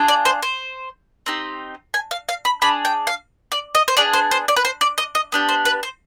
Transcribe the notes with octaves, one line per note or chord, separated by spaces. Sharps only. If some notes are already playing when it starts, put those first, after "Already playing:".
Already playing: D4 F4 G#4
D5
C5
C5
C4 D#4 G4
G#5
F5
F5
B5
D4 G#4 B5
G5
F5
D5
D#5
C5
B3 D4 G#4 D5
C5
C5
D5
B4
C5
D5
D#5
D#5
B3 D4 G4
C5
B4
C5